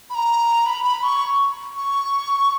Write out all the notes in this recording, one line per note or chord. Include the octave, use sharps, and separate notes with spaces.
B5
A#5
B5
B5
C#6
C#6